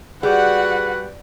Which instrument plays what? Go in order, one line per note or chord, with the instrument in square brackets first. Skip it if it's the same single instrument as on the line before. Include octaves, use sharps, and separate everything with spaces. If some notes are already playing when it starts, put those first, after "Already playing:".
[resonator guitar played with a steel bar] G3 [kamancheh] F#4 F#5 [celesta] G#4 [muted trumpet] B4